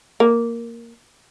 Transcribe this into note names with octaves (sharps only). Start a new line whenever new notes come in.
A#3